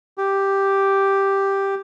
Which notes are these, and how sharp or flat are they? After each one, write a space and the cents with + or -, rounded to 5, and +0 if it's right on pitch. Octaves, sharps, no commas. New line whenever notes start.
G4 +0